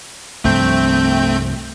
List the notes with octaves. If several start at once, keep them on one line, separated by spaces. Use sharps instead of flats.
C2 G2 F3 A3 C4 G6